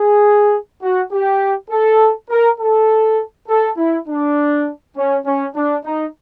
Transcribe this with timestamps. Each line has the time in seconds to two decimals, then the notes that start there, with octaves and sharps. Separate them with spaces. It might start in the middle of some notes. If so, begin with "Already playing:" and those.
Already playing: G#4
0.82 F#4
1.11 G4
1.70 A4
2.29 A#4
2.59 A4
3.48 A4
3.77 E4
4.08 D4
4.96 C#4
5.25 C#4
5.55 D4
5.85 D#4